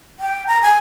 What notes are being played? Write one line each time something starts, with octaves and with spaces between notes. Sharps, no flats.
G5
A#5
G#5